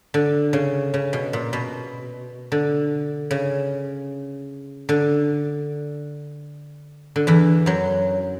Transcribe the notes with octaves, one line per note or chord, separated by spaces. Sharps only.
D3
C#3
C#3
B2
A#2
B2
D3
C#3
D3
D3
E2 E3
F#2 F#3